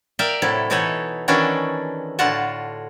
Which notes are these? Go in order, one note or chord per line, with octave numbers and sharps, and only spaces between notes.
A#4 D5 E5 F5 G5
A2 C3 F#3 E4 A4
B2 E3 D#4 A4 C#5 F#5
D#3 E3 C#4 D4 F#4 A4
A2 D3 F4 F#4 F#5 A5